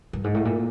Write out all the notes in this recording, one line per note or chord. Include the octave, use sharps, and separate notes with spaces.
G2
G#2
A2
A#2